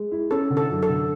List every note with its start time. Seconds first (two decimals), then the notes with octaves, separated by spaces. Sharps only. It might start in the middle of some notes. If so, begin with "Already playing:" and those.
Already playing: G#3
0.12 E4
0.31 C#4 A4
0.50 D3
0.57 A4
0.70 F#2
0.83 A4
0.89 D3